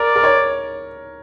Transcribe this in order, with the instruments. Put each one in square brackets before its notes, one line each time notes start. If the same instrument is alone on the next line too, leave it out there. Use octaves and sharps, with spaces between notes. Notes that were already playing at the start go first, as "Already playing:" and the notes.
Already playing: [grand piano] A#4 [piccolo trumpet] D5
[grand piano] A#4
C#5